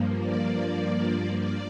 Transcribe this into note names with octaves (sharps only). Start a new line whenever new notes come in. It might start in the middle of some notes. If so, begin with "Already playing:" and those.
Already playing: G2 F3 A#3
D5
D5